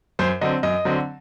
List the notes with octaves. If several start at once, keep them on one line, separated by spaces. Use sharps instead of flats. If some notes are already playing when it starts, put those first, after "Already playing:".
F#2 C5
D3 F#3 C4 D#5
F#2 D#5
D3 F#3 C4